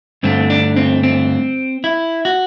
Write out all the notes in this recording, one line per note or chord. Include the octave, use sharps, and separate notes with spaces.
G2 D3 A3 C4
D4
C4
C4
E4
F#4